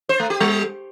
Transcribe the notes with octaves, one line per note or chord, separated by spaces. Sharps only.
C5
A3
G4
G3